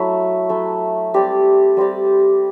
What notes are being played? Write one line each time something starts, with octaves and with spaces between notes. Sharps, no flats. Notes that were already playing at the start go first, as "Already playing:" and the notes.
Already playing: F#3 A3 E4
F#3 A3 E4
G3 C4 G4 D5
G3 C4 G4 D5